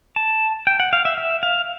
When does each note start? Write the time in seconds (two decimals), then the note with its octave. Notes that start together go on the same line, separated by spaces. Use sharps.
0.16 A5
0.67 G5
0.80 F#5
0.93 F5
1.05 E5
1.18 E5
1.43 F5